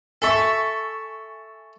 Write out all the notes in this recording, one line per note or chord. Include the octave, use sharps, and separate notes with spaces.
A4 E5 G#5 C#6